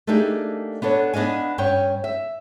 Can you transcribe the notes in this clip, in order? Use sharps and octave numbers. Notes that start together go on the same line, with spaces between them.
A3 A#3 D4 D#4 G4 G#4
B3 D4 A4 C#5
B3 D4 D#5 F5 G#5
G2 C#4 C#5 G5
E5